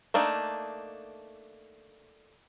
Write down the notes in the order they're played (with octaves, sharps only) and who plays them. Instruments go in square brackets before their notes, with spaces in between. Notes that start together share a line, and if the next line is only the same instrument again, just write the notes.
[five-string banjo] A3 A#3 D4 D#4